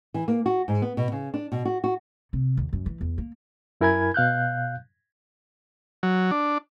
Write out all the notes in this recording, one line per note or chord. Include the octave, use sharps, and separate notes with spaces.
E3
A#3
F#4
G#2
B3
B2
C#3
D4
B2
F#4
F#4
C3
D#2
F#2
E3
E2
A#3
F#2 E4 A#4 G#5 B5 G#6
B2 F5 F#6 G6
F#3
D4